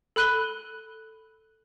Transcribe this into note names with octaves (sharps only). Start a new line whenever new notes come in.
A4 B5 F#6 D#7 G7